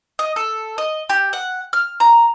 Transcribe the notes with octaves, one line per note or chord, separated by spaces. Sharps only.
D#5
A4
D#5
G4
F#5
F6
A#5